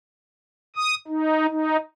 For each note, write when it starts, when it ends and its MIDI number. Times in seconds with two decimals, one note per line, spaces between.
0.76 0.95 87
1.08 1.46 63
1.50 1.77 63